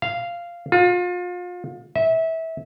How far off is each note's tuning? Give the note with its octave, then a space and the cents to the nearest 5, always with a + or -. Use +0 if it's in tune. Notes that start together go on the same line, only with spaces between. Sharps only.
F5 -10
F4 +35
E5 -25